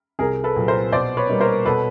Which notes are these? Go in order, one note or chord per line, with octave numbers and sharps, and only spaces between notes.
C2 G#4 A#4
A4 B4
A#2 F#3
A#4 C5
B2 C5 D5
B4 C#5
G3 A#3 D#4
A#4 C5
B2 A4 B4